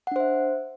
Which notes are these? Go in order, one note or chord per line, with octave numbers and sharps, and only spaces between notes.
D4 C5 E5 F#5